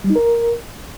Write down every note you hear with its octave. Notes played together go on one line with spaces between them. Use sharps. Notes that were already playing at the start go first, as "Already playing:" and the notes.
G3
D#4
A#4